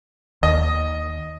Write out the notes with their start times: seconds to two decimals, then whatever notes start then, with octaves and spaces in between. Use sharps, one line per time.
0.43 D#2 D#5